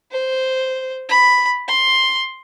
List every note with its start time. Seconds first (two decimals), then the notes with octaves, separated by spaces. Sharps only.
0.12 C5
1.09 B5
1.68 C6